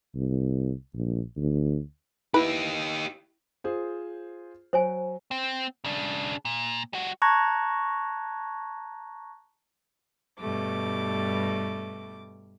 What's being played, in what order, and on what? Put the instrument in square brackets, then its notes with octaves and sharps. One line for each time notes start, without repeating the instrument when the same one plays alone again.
[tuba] C2
A#1
D2
[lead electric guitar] D#4 G4 [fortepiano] E4 [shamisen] B4
[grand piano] F4 G#4 C5
[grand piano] F#3 [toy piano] C5 C#5 G#5
[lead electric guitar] C4
C#3 D4
A#2
G3 F#4
[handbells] A5 A#5 C#6 F#6 G#6 A#6
[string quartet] G2 B2 G3 A3 D6